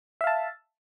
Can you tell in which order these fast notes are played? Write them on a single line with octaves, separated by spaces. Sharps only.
E5 F5 A5